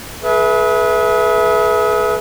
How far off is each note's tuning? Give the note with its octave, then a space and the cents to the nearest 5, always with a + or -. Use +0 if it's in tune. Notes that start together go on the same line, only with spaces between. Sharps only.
G#4 +40 B4 -20 E5 +0